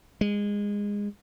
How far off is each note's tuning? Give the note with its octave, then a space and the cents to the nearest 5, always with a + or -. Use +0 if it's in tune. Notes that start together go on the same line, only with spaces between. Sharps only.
G#3 -20